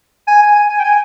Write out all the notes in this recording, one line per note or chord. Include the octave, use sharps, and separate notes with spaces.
G#5
G#5
G#5
G#5
G5
G#5